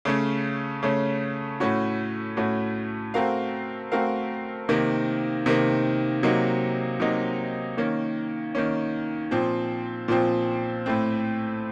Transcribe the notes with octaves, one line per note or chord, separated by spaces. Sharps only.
C#3 A3 C#4
C#3 A3 C#4
A2 A3 C#4 F#4
A2 A3 C#4 F#4
A3 C4 F#4 A#4 F5
A3 C4 F#4 A#4 F5
C3 D#3 A#3
C3 D#3 A#3
C3 F#3 A#3 D#4
C3 F#3 A#3 D#4
D#3 A#3 C#4
D#3 A#3 C#4
A#2 F3 C4
A#2 F3 C4
A2 A3 C4